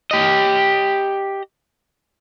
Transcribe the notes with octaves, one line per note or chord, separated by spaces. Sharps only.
G4 D#5